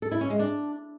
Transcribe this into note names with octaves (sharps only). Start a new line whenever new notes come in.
A4
E4
C#4
G#3
D4